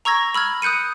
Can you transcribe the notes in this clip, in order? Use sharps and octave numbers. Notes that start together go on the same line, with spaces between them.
A#5 C#6 E6 G#6 A#6
B5 E6 F6 G#6
D#6 F#6 G6 C#7 D#7